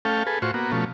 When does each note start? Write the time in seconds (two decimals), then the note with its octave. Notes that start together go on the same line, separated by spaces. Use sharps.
0.05 A3 C#4 A4 F5 G5
0.27 G#4 A4 B4
0.42 A2 F4 F#4 C5 C#6
0.54 A#3 B3 F#4
0.72 B2 F3 A3 C#4